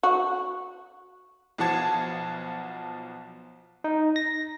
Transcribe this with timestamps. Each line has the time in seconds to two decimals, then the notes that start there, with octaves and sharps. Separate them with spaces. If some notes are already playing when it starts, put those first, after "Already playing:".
0.03 F#4
1.58 B1 F3 F#4 A5 G#6
3.84 D#4
4.16 A#6